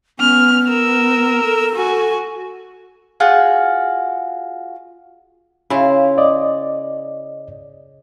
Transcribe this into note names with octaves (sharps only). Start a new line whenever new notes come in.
B3 C#4 F6
A#4 E6
A4
F#4 G#5
F4 F#4 G#4 F#5
C#3 E4 F4
D5 D#5